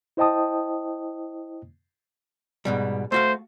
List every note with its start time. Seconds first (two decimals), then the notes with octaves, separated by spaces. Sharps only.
0.17 E4 C5 D#5 G5 A5 D#6
2.65 G#2 B2 G3
3.12 A3 F#4 C5 F5